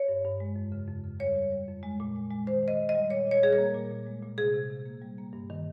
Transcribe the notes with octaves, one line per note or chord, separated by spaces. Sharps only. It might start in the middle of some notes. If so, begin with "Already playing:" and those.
Already playing: C#5
G2
G2
G#3
F2
C#3
F2
C#3
G3 C#5
G3
G3
F2
G#3
A#2
G#3
G#3
D#3 C5
D#3 D#5
D#3
D#5
G3
A#2 C#5
A#2 C#5
G3 G#4
A#4
A#3
A#2
A#2
G#3
A#2
C3 G#4
C3
C3
A#3
G3
A#3
G2
D#3